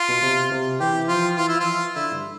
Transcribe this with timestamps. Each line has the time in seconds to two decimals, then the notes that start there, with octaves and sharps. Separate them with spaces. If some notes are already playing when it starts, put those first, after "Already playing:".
Already playing: F4
0.09 B2
0.22 C3
0.51 C3
0.80 E3 G4
1.08 F3 F4
1.37 E3 F4
1.49 E4
1.57 F3 F4
1.95 D3 E4
2.13 G2